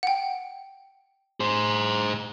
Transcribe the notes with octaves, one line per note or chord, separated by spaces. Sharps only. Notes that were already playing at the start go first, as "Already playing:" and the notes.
F#5 G5
G#4 C5